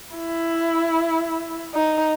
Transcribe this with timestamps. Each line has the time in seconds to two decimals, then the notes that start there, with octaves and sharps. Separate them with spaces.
0.17 E4
1.74 D#4